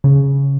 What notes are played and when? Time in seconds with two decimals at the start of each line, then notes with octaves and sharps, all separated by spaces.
0.04 C#3